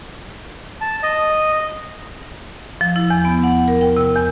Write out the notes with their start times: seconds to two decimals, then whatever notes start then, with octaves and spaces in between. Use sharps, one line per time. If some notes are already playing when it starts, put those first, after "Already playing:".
0.81 A5
1.03 D#5
2.81 F3
2.96 E4
3.10 E2
3.25 B3
3.43 F#5
3.68 A#4
3.81 G5
3.96 C3
4.16 E2